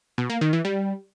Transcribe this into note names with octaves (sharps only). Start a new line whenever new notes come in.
B2
A#3
D#3
E3
G3